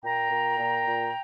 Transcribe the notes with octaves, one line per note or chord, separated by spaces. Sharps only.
A#2 G5 A#5
A#2
A#2
A#2